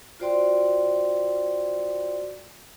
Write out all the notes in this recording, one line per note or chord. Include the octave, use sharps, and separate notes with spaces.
F4 F#4 C5 D5 G5 C6